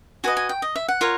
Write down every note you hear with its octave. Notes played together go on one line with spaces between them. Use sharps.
F#4 B4 D#5 G#5
G#5
G5
D#5
E5
F#5
F4 A#4 C#5